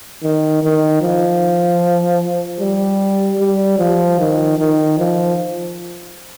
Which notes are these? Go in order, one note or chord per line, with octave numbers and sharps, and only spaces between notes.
D#3
D#3
F3
G3
G3
F3
D#3
D#3
F3